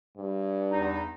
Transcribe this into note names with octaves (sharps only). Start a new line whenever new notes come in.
G2
E2 D#4